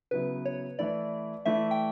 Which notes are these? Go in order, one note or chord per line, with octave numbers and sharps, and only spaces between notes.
C#3 F#3 B3 E4 B4
C#5
E3 A3 E4 D5
E3 A3 E4 E5
G5